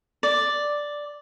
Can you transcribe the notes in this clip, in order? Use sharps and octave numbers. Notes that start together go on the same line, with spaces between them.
D5